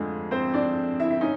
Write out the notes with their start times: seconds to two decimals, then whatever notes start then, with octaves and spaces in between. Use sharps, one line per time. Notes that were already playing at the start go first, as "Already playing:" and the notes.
Already playing: F2 D3 F3 G#3 A3 G#4
0.31 C4 C5
0.54 D4 D5
1.00 E4 E5
1.11 E5
1.21 C#4 D#4